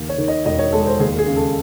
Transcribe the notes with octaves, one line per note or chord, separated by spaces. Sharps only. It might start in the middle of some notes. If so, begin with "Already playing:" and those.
Already playing: D#2
C#5
D#3
D#5
E1 D#5
C#5
G#3 A4
C5
D#2 G#4
G#4
C#3
A4